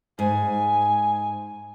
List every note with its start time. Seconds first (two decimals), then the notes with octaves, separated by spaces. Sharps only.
0.19 G#2 G#5